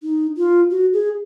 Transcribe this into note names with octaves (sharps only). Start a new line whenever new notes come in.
D#4
F4
F#4
G#4